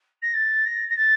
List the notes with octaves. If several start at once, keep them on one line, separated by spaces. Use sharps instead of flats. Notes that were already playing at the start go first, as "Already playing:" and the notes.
A#6
A6
A#6
A#6
A6